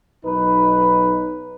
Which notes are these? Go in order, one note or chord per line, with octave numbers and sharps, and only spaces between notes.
B1 D#4 B4